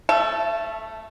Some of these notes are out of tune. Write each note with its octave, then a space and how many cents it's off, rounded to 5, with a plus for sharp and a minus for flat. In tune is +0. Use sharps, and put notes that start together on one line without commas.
A3 +0 A4 -15 E5 +35